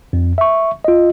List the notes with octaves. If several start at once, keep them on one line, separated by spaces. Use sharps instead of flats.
F2
E5 C#6
F4 D#5